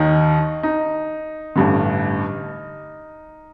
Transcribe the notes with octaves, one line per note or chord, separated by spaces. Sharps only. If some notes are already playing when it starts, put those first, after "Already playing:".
Already playing: D#2 D#3 D#4
D#4
A1 G2 D3